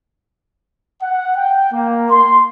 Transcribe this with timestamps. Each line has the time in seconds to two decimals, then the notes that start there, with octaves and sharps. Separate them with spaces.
1.02 F#5
1.36 G5
1.72 A#3
2.10 C6